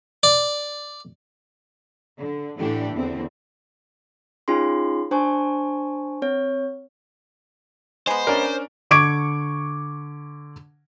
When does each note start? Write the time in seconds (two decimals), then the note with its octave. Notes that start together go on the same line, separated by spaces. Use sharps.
0.23 D5
2.18 D3
2.58 A2 D3 E3 D4 G4 A4
2.94 E2 D3 E3 C4
4.48 C#4 D#4 F4 G#4 C6
5.11 D4 C5 G#5 A5 C#6
6.22 C4 C#5
8.07 G#3 B3 C5
8.27 C#4 D4 A#4
8.91 D3 C#6 D6 G#6 D7